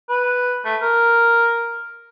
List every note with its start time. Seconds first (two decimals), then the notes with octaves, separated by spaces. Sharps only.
0.09 B4
0.65 A3
0.82 A#4